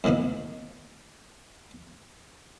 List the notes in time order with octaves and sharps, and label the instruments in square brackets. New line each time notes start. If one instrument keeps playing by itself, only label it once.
[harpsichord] F#2 A2 D#3 A#3 B3